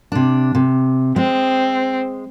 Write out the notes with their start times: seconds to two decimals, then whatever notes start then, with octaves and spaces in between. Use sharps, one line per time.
0.12 C3 D4
0.55 C3
1.16 G#3 C4